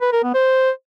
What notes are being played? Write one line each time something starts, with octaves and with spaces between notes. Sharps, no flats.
B4
A#4
B3
C5